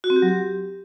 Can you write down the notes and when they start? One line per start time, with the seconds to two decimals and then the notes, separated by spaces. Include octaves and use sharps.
0.04 F#4
0.10 C4
0.16 G4
0.22 F#3
0.29 G4